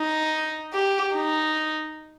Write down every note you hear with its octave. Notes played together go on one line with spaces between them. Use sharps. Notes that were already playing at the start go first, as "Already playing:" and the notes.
Already playing: D#4
G4
D#4